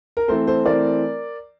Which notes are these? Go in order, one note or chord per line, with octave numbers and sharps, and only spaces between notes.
A#4
E3 A3 C4 A4 C5
A4 C5
E3 A3 C4 A#4 D5